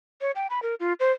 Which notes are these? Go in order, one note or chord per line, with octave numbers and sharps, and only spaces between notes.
C#5
G5
B5
A#4
F4
C5